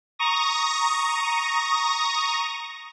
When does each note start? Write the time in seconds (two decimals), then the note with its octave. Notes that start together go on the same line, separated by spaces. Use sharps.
0.19 A#5 C#6 D#6 A#6